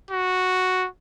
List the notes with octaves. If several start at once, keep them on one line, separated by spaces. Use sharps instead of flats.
F#4